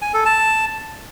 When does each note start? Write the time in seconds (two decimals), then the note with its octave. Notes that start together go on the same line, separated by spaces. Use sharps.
0.02 G#5
0.14 A4
0.26 A5